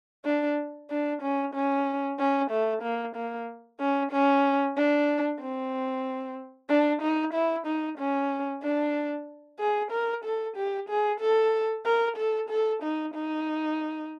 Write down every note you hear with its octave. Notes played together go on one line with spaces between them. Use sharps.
D4
D4
C#4
C#4
C#4
A3
A#3
A#3
C#4
C#4
D4
C4
D4
D#4
E4
D#4
C#4
D4
G#4
A#4
A4
G4
G#4
A4
A#4
A4
A4
D#4
D#4